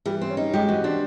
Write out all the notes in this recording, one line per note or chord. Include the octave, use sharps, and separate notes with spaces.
E3 G3
C4
C#4
D#4
G#3 G4
E3 F#4
C4 D4